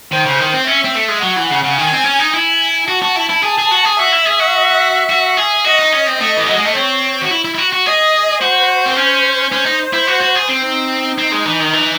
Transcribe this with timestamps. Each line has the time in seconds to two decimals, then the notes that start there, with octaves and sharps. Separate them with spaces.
0.12 D#3 C5
0.26 C#3
0.40 D#3
0.53 C4
0.67 C#4 E5
0.84 C4
0.95 A3
1.09 G#3
1.22 F#3 F#5
1.37 E3
1.50 C#3
1.63 C#3
1.78 D#3 G#5
1.92 C4
2.05 C#4
2.19 D#4
2.33 E4 G#5
2.88 F#4 A5
3.02 F#4
3.16 E4
3.29 E4
3.43 G#4 A5
3.58 G#4
3.71 F#4
3.85 G#4
3.99 F#4 E5
4.13 E4
4.26 G#4
4.40 F#4
5.10 F#4
5.37 G#4
5.65 F#4 D#5
5.79 D#4
5.93 C#4
6.07 C4
6.20 A3 D#5
6.37 E3
6.47 F#3
6.56 G#3
6.66 A3
6.75 C4 C#5
7.21 F#4
7.31 E4
7.45 E4
7.55 E4
7.58 F#4
7.73 F#4
7.86 G#4 D#5
8.42 F#4 C5
8.86 C4
8.96 C#4
9.52 C#4 C5
9.65 D#4
9.93 E4
10.07 F#4
10.21 F#4
10.36 G#4
10.49 C4
10.63 D#4
11.18 C4
11.32 G#3
11.45 E3
11.60 D#3
11.73 E3